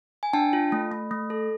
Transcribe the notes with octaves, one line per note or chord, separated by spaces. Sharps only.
G#5
D4 G5 A5
F4
A3
A3
A3
A4